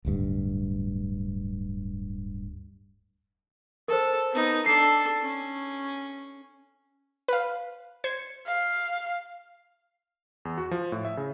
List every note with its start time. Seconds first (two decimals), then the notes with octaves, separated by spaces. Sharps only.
0.05 D1 D2 G2
3.88 A4 A#4 C5
4.31 B3 D#4
4.66 D4 A4 C7
5.22 C#4
7.28 B4 F5
8.04 C5 G#6 C#7
8.46 F5
10.45 E2
10.58 F#4
10.71 F3
10.92 A2
11.05 E5
11.17 C#3